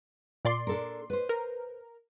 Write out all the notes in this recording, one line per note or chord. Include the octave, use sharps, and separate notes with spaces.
A#2 D5 C6
D4 A4 A#4
B4 C5
A#4